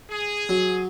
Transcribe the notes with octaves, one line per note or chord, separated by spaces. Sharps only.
G#4
F#3